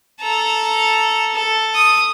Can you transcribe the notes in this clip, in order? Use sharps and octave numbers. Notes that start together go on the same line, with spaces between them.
A4 A#5
A4
D#6